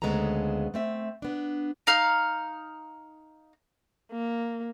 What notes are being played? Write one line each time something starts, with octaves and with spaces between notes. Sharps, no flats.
D2 C#3 G#3 B3 A4 A#5
A3 C4 E5
B3 D4
D#4 F5 F6
A#3